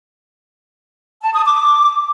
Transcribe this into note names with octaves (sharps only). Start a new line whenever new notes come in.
A5
D#6
D6